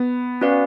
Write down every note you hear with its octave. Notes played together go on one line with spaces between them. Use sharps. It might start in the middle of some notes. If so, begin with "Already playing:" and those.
Already playing: B3
C#4 F#4 B4 D5 F5